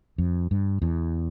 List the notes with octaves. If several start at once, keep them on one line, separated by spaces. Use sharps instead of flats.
F2
G2
E2